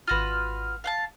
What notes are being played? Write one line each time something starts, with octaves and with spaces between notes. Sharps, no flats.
G#1 F4 F#4 B4 F6
F5 F#5 A5